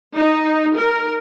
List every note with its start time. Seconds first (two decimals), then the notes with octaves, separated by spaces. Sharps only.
0.17 D#4
0.77 A#4